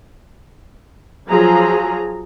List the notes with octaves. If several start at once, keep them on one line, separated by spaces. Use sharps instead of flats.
F3 F#3 G#4 A#5